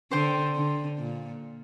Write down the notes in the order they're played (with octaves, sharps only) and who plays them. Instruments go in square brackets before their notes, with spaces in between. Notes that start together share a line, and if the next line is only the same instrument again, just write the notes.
[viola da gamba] D3 [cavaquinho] C5 G5 C6
[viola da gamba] D3
A#2